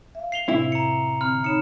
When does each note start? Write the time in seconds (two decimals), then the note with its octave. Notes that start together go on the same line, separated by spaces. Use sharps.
0.15 E5 F5
0.32 C7 F7 G7
0.48 A2 C3 C4 E4
0.72 A#5 C#7
1.21 D3 C4 B5 F6
1.44 D#4 C#5 B5 C#7 E7